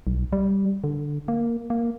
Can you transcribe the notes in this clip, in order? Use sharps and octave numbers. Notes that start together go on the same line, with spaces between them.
B1
G3
D3
A#3
A#3